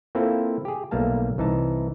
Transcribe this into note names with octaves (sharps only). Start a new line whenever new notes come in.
A#3 C4 E4 F4 A4 A5
G4 G#4
B1 G3 A3 A#3 F5 A5
C2 E3 D#4 A5